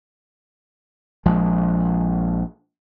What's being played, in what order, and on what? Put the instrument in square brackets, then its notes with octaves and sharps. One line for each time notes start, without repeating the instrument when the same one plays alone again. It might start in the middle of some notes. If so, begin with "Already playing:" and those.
[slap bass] A#1 F3 G#3